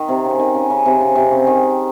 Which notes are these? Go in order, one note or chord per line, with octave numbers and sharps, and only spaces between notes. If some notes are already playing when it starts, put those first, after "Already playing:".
Already playing: D#3
C3
C#3
D#3
C#3
C#3
C3
C#3
C3
C#3
D#3